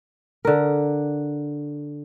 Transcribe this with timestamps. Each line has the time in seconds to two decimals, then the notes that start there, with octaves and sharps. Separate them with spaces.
0.45 D3 A#4